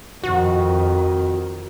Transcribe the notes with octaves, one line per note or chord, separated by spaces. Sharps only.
F2 D#3 F#4